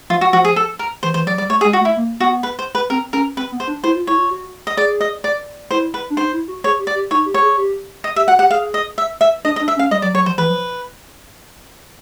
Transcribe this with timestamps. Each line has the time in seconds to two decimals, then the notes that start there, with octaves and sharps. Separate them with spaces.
0.10 F3 F4
0.21 F#4
0.33 F3 F#4
0.45 G#4
0.56 A4
0.79 A#4
1.03 E3 C5
1.14 E3 C5
1.26 F#3 D5
1.38 G3 D5
1.49 A3 C#5
1.61 G#4
1.65 G#3
1.73 F#4
1.81 A3
1.85 E4
1.97 A#3
2.20 B3 F#4
2.43 B4
2.59 C5
2.75 B4
2.90 C4 A#4
3.13 C#4 A#4
3.37 C4 B4
3.52 B3
3.60 C5
3.67 D4
3.83 E4 C5
3.95 F4
4.07 E4 C#5
4.18 F4
4.31 F#4
4.67 D#5
4.77 G#4 D5
5.01 D#5
5.24 D5
5.71 E4 C5
5.94 B4
6.10 D4
6.17 D#4 C5
6.33 E4
6.48 F#4
6.64 G#4 C#5
6.79 G4
6.87 D5
6.95 G4
7.11 D#4 C#5
7.26 G4
7.34 C#5
7.42 G#4
7.57 G4
8.04 D#5
8.16 G4 E5
8.27 F#4 F#5
8.39 G4 F#5
8.51 G#4 F5
8.74 D#5
8.98 E5
9.21 E5
9.44 D4 D#5
9.56 D#5
9.60 D4
9.68 E5
9.76 C#4
9.79 F5
9.91 G3 D#5
10.02 F#3 D5
10.14 F#3 C#5
10.26 F3 C5
10.37 E3 B4
10.50 F3